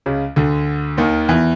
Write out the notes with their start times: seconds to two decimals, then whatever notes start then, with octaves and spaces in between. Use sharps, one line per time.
0.06 C#2 C#3
0.36 D2 D3
0.97 D#2 D#3
1.28 E2 E3